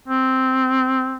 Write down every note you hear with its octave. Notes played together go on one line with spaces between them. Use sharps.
C4